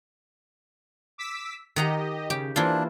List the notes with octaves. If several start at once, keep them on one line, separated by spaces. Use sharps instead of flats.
D6 E6 B6
D#3 G4 D#5 F#5 A#5
C#3 G4
E3 A#3 D4 E4 F4 C5